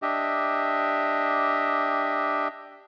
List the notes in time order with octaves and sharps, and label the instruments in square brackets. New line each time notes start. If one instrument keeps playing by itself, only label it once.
[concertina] D4 G4 D#5 E5